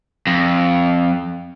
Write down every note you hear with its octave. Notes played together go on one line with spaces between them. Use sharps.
F2